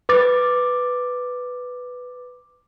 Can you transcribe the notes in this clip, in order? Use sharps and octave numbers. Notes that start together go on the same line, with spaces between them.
B4 D6 A6